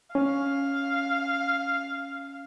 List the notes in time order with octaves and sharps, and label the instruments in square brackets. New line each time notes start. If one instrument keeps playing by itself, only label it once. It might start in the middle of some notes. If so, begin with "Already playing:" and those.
[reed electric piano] C#4 [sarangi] F5